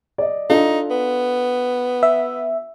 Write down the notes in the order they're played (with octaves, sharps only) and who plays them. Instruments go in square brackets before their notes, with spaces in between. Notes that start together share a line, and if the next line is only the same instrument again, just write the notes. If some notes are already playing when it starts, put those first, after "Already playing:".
[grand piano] D5 D#5
[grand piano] D4 F4 A4 [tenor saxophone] D#4
[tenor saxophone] B3
[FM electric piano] E5